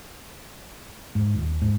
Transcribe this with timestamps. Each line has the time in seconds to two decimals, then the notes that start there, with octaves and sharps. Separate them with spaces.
1.15 G#2
1.34 D#1
1.62 G#2